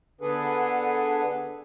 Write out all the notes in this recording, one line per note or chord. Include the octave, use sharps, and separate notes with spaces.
D3 B3 D4 G#4 A4 B4